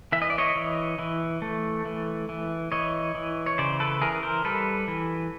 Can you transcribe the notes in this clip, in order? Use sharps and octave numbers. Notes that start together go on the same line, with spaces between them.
E3 E5
D#5
D5
C#5 D#5
E3
E3
A3
E3
E3
E3 C#5 D#5
E3
C#5
C#3 C5 D5
A4 B4
E3 G#4 A#4
A#4 C5
G3 A4 B4
E3